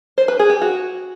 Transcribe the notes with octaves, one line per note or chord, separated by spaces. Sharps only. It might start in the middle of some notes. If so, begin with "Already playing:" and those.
C5
B4
G#4
G4
F#4